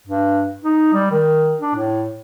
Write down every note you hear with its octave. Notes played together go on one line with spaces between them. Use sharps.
G2
D#4
G3
D#3
D4
A2